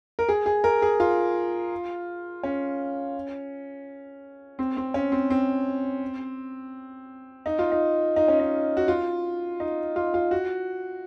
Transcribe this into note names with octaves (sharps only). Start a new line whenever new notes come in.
A#4
G#4
G#4
A#4
G#4
F4
C#4
C4
C4
C#4
C4
C4
D#4
F4
D#4
D#4
C#4
D#4
F#4
F4
D#4
F4
F4
F#4